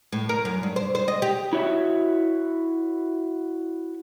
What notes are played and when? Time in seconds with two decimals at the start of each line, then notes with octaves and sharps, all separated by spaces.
0.12 A2
0.29 A#4
0.45 F#2
0.63 G2
0.76 C5
0.95 C5
1.08 D#5
1.22 G4
1.53 E4 F#4 C#5 E5